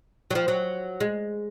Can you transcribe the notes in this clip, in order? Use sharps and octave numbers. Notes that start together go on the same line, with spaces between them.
F#3
F3
F#3
G#3